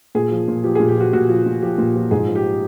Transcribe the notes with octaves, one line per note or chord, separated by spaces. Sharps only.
A#2 G#4
F3
A#2
F3 G4
G#4
A#2
G4
F3 F#4
A#2 F#4
F3
A#2
F3 G4
A#2
F3
G#2 G#4
F3
G4